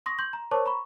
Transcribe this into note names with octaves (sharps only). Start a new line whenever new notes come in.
C6 C#6 D#6 A#6
C6 G6 F#7
A#5
A#4 C5 C#5 A5 C#6 D6
A#5 B5 C#6